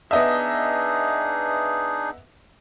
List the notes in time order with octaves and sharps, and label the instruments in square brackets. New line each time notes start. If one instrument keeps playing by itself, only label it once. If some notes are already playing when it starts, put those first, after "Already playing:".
[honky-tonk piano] B3 D#5 E5 [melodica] D4 D#4 G#4